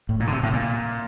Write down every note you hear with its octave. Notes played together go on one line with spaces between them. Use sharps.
A2
A#2
D3
C3
A2
A#2